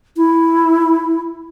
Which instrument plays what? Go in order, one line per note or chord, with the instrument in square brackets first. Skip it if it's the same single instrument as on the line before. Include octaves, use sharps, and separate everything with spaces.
[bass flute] E4